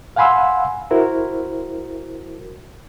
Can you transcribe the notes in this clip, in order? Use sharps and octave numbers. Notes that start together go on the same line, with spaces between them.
F5 F#5 G#5 B5 C6 E6
E4 F#4 A#4 C5